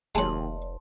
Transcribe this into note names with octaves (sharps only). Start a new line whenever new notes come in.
F1 D#2 F#3 G#3 A5 C6